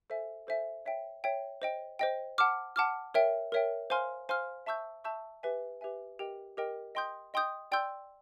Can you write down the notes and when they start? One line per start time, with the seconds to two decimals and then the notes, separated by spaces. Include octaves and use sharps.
0.10 A4 C5 E5 G#5
0.47 A4 C5 E5 G#5
0.86 C#5 E5 G5
1.24 C#5 E5 G5
1.62 C5 D#5 G5
1.99 C5 D#5 G5
2.38 F#5 A5 D6 F6
2.76 F#5 A5 D6 F6
3.14 A#4 C#5 E5 G5
3.52 A#4 C#5 E5 G5
3.90 C5 F5 G#5 C6 F6
4.29 C5 F5 G#5 C6 F6
4.66 E5 A5 C#6 E6 G6
5.04 E5 A5 C#6 E6 G6
5.43 G4 B4 E5 G#5
5.81 G4 B4 E5 G#5
6.19 G4 A#4 D#5 G5
6.57 G4 A#4 D#5 G5
6.95 D#5 G5 C6 D#6 G6
7.34 D#5 G5 C6 D#6 G6
7.72 D5 G5 C6 E6 G6